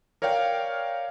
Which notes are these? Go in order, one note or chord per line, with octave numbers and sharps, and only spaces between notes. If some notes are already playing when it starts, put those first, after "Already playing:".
A#4 C#5 D5 F5 G5